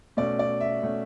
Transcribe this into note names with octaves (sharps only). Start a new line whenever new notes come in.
B2 A3 C#4 D5
D5
E5
B2 A3 C#4